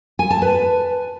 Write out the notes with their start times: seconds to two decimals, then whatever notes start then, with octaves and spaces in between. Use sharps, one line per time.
0.19 G#5
0.30 A5
0.42 B4